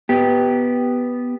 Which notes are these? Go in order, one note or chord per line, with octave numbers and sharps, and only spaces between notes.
B3 G4